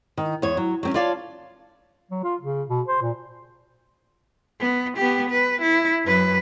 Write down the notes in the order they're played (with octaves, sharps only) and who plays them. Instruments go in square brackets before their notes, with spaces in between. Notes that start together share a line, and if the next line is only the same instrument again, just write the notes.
[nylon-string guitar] D#3
E2 C#5
F#3
F#3 C4 C#4
F4 C#5 D5 F5 A5
[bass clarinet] F#3
F4
C#3
B2
C5
A#2
[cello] B3
B3 G4
B4
E4
F#2 B4